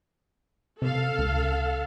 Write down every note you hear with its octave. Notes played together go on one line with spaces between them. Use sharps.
C3 A4 F5
C#2